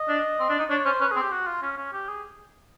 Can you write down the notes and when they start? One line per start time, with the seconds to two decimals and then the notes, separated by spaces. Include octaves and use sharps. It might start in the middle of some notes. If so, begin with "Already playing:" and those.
Already playing: D#5
0.08 D4
0.40 C4
0.50 D4
0.59 D#4
0.70 D4 C#5
0.86 C#4 C5
1.00 C#4 B4
1.11 G#4
1.16 C4
1.22 G4
1.32 F#4
1.47 F4
1.63 C#4
1.78 C#4
1.93 G4
2.09 G#4